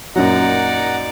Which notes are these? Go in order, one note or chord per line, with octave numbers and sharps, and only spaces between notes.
F#2 A#2 F#3 D#4 D5 F#5 A#5